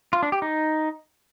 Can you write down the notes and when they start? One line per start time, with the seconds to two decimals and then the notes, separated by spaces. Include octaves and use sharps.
0.13 F4
0.23 D4
0.32 G4
0.42 D#4